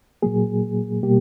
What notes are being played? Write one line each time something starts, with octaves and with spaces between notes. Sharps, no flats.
A#2 F#3 A#3 G#4
B2 G3 A#3 G4